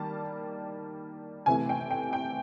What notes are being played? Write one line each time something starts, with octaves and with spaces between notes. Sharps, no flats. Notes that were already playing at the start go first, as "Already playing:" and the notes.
Already playing: D#3 G3 A#3 A5
C3 E3 A3 G#5
G5
G5
G5